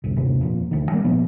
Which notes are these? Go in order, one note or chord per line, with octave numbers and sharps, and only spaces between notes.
D1 G1 C2
G1 D#2 C3 A#3
E1 F2 A#2
D2 D#3
G3 G#3 A#3
A#2 F3 B3